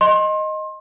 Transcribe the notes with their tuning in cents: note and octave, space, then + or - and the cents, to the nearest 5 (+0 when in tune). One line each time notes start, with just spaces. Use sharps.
D#5 +0 C6 +30